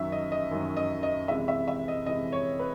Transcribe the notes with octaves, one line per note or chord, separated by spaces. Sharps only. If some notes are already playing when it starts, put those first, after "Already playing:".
Already playing: F#2 D#3 F#3 E5
D#5
D#5
F#2 D#3 F#3
D#5
D#5
C3 E3 G#3 E5
E5
E5
D#5
C3 E3 G#3 D#5
C#5
B4